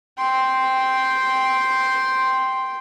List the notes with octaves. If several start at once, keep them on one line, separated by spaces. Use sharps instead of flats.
G5 C6